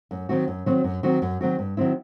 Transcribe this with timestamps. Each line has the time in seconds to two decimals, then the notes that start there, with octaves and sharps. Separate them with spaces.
0.11 F#2
0.29 D#3 F#3 C4 F#4
0.48 F#2
0.66 D#3 F#3 C4 F#4
0.84 F#2
1.03 D#3 F#3 C4 F#4
1.22 F#2
1.41 D#3 F#3 C4 F#4
1.59 G2
1.77 D#3 F#3 C4 E4